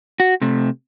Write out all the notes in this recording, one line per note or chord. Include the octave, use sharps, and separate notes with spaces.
F#4
C3 A3